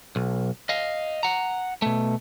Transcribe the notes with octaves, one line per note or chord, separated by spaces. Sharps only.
B1
D#5 F5
F#5 A#5
B2 A3